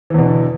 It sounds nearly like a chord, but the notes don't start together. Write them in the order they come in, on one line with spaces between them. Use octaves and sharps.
E3 E2 B2 D3